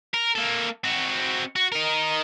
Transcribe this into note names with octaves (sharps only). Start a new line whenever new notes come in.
A#4
A#3 A4
C4 F#4
F#4
D#4 A#4